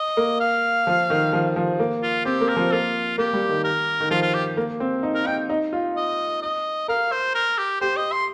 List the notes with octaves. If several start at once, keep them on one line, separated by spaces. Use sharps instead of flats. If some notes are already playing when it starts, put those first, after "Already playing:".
Already playing: D#5
A#3
F5
F3
D#3
F3
F3
A#3
F4
C4 G4
A#3
A#4
F3
A#3 F4
A#3 G4
G3
D#3
A#4
D#3
F3 F4
F4
G4
A#3
C4
D#4
A#4
D#4 G5
D#4
F4
D#5
D#5
A#4 F5
C5
A#4
G4
G4 C5
D#5
C6